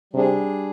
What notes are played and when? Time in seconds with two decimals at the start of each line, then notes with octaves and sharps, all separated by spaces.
0.13 C3 G3 D4 G#4